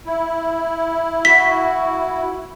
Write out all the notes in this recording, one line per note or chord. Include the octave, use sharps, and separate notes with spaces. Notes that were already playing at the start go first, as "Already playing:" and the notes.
E4
F#4 B6